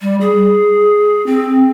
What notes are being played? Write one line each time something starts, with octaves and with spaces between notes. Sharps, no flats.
G3
G#4
C4